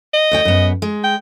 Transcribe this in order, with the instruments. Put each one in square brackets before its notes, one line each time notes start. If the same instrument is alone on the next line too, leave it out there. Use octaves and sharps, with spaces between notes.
[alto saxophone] D#5
[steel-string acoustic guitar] D2 C#5 G5
F#2 B3
G#3
[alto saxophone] G5